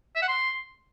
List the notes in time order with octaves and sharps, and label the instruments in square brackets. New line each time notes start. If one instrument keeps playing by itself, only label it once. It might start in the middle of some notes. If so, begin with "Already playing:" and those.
[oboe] E5
F#5
C6